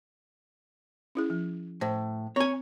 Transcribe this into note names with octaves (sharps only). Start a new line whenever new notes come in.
C#4 E4 G#4
F3
A2 C5
C4 C#5 G#5